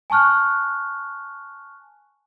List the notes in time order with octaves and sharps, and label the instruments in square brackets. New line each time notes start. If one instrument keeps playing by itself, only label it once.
[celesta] G#5 A5 C#6 F6 F#6